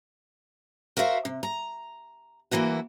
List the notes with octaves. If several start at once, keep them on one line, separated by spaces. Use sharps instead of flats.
F#4 A#4 C5 E5 F5
C3
A#5
D2 E3 A#3 E4 F#4